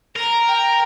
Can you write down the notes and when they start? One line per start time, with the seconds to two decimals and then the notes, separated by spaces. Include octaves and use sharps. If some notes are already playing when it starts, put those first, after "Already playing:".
0.15 A#4 A#5
0.47 G5